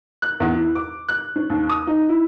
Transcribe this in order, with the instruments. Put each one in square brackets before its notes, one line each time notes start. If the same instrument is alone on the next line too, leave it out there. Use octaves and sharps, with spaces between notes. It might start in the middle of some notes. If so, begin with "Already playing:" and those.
[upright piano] F#6
E2
E4
D6
F#6
C#4
D#2
D#6
D#4
E4